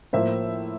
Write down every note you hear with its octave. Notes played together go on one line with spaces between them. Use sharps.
A2 F3 A#3 C5 E5